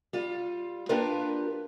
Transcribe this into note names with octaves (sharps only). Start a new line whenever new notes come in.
G3 F4
A#3 D4 F4 G4 A#4 B4